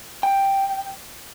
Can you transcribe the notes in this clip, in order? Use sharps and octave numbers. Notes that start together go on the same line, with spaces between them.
G5